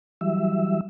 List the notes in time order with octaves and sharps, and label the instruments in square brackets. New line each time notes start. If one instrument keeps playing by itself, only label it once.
[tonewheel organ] E3 F#3 G3 E5